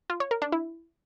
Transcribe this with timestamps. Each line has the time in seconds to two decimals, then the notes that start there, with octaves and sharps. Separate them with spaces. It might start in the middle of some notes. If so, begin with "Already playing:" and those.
0.10 F4
0.20 C#5
0.31 A#4
0.42 D4
0.52 E4